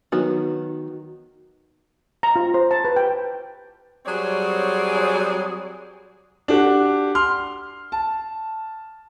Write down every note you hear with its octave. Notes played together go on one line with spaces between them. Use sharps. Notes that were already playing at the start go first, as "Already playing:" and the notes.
D#3 F#3 B3 F#4
A#5
F4
C5
A5
B4
G5
F#3 G3 C4 G#4 C#5 D5
D4 F#4 G4
C6 F6
A5